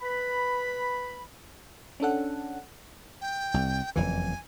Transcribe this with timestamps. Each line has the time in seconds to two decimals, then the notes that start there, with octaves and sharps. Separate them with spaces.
0.01 B4 B5
2.00 C#4 D4 A4 F#5
3.21 G5
3.54 C2
3.96 F#1 F2 E3 G#5